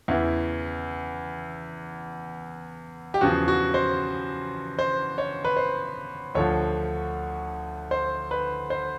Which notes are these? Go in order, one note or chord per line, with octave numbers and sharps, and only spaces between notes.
E2 C#3 E3 E4
G4
E2 C#3 F3 F#4
F#4
C5
C5
C#5
B4
C5
D2 D3 F3 C#5
C5
B4
C5